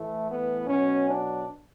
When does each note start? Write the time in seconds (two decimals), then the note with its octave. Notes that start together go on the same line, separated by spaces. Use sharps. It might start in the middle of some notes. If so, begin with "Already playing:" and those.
Already playing: A2 E3 A3
0.29 B3
0.68 B2 F#3 C#4
1.09 D4